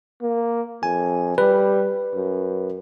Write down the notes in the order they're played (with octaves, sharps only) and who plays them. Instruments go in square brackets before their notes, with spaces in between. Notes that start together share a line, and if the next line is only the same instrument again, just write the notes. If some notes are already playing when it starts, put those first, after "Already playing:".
[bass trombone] A#3
[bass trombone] F2 [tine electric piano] G#5
[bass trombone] G3 [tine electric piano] B4
[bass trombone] F#2